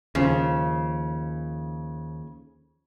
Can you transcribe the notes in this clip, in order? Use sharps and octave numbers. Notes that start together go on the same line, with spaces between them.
D#2 C#3 F3